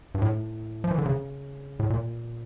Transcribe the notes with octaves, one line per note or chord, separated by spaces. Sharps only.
G2
A2
F3
E3
D3
C#3
A2
A#2